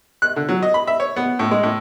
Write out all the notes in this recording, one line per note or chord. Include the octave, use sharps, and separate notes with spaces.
F#6
D3
F#3
D#5
B5
E5
C#5
B3
A2
G#3
A2